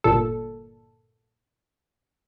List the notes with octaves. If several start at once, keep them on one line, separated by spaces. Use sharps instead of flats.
G1 A#2 A4